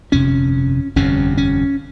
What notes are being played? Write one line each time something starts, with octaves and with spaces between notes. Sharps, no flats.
G1 F2 C3 C#4
G1 F2 C3 C#4
C#4